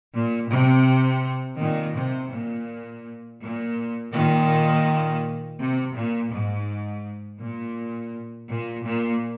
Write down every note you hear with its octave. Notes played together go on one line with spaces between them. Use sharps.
A#2
C3
A#2 D#3
C3
A#2
A#2
A#2 D#3
C3
A#2
G#2
A#2
A#2
A#2